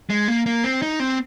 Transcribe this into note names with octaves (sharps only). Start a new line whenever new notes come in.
G#3
A#3
A#3
C4
D#4
C4